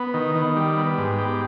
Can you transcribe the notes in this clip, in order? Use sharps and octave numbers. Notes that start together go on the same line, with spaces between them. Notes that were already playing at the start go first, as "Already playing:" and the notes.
Already playing: B3
D#3
D#3
G3
B3
G#2
G4